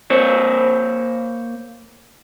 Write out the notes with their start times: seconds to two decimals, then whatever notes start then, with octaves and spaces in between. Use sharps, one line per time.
0.10 A#3 C5 C#5